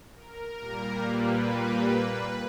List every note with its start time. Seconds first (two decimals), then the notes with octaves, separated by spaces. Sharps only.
0.15 A#4
0.59 A#2 G3 A#3
1.03 B4